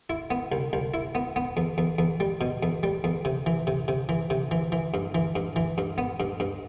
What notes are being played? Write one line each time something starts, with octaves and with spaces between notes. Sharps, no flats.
E4
B3
C2
C2
E4
B3
B3
E2
E2
E2
G3
B2
E2
G3
E2
C3
E3
C3
C3
E3
C3
E3
E3
G2
E3
G2
E3
G2
B3
G2
G2